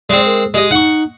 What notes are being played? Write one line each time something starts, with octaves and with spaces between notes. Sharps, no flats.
G#3 C4 D5
A#4
G#3 G4 D#5
D#4 F#5 C#6